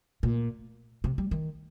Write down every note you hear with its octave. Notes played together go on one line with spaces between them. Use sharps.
A#2
C3
G3
D#3